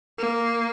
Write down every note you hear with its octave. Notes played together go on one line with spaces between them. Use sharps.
A#3